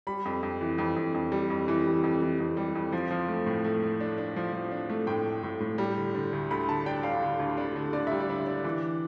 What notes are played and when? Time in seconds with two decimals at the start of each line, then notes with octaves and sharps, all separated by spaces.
0.07 G3 B5
0.25 F2
0.43 F2
0.61 E3
0.78 F2
0.96 F2
1.14 F2
1.32 G3
1.50 F2
1.68 E3
1.86 G3
2.04 F2
2.22 E3
2.40 F2
2.57 G3
2.75 F2
2.92 F3
3.11 F3
3.28 A3
3.46 A2
3.64 A3
3.82 A3
4.00 D4
4.18 D4
4.36 F3
4.53 F3
4.71 D4
4.90 A3
5.07 A2 G5
5.26 A3
5.43 A2
5.60 A2
5.78 G3
5.97 D3
6.15 D3
6.33 D2
6.51 D2 B5
6.68 D3 A5
6.86 D4 G5
7.03 D4 F5
7.22 D3
7.39 D2
7.57 D4
7.76 D3
7.93 D3 D5
8.07 G3 E5
8.20 D5
8.29 D4
8.46 D4
8.64 E3